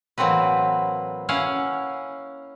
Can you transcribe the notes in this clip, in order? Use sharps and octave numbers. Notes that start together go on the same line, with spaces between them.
A2 E3 F#3 A#3 C4 B4
C#4 E4 F5 F#5 G#5